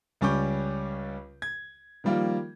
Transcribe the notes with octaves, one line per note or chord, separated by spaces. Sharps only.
C#2 G3 C#4 C#6 D6 G6
G#6
D#3 F3 G3 A#3 F4